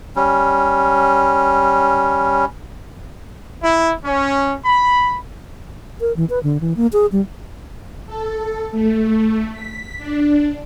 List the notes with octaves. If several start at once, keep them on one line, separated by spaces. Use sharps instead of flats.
G3 C#4
E4
C#4
B5
A#4
E3
B4
D3
E3
A#3
G#4
G3
A4
A3
B6
D4